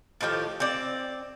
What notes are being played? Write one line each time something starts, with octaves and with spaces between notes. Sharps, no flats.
A2 D#3 F3 G4
C4 D5